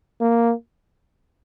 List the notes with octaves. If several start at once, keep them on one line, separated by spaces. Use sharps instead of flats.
A#3